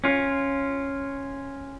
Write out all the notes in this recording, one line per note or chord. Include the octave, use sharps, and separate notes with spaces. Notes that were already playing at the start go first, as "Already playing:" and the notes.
C#4 F4